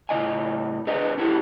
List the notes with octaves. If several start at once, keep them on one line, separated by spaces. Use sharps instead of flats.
A2 C#3 D#4 D#5 G#5
D4 G#4 A#4 B4 D#5
C#4 E4 F#4 G4 A4